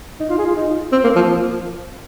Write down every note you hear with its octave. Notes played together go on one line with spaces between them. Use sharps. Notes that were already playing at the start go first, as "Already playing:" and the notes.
D#4
F4
G#4
F4
D#4
C4
A#3
F3